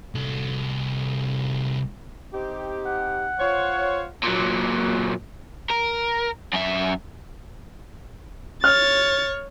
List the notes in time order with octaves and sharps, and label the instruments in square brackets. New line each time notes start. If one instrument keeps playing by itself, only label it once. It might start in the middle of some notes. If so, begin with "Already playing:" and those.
[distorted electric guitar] C2 A4
[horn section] C4 D#4 G4
[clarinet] F#5
[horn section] F4 C5 C#5
[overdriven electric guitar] A#2 F#3
A#4
F#2 E5
[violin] C#5 [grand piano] F6 [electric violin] A6